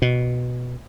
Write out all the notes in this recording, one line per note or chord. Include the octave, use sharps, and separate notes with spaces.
B2